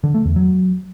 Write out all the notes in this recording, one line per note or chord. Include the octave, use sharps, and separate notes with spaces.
D3
A3
E2
F#3